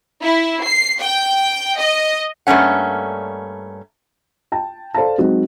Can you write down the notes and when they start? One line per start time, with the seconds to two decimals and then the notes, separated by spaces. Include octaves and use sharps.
0.21 E4
0.63 C7
1.01 G5
1.77 D#5
2.47 G2 A3 A#3 C#4 F#5
4.52 G5 A5
4.95 A4 C5 D5 F5 A5
5.18 F#3 G#3 C4 D#4 F#4